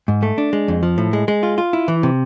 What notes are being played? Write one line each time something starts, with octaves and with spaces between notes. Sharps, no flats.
G#2
A3
D4
G#3
F2
F3
A2
G#3
G#3
F4
F4
E4
E3
C3